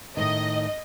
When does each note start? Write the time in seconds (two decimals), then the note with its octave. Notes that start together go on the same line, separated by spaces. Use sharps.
0.17 A2 D#3 D#5